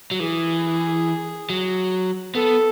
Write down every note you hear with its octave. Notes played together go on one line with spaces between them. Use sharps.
F#3
E3 G#4
F#3
B3 A4